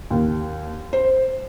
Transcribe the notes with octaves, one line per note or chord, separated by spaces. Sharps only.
D#2
C5